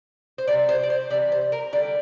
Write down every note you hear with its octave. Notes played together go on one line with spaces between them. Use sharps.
C5
C3 E3 G3 D5
C5
D5
C5
C3 E3 G3 D5
C5
A#4
D3 G3 D5